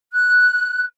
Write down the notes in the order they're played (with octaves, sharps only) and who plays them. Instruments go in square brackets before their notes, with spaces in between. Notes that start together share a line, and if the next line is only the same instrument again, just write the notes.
[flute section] F#6